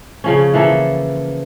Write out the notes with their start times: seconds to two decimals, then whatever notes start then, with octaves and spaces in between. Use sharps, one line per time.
0.24 C#3 F3 C#4
0.54 E3 F3 A#3 A4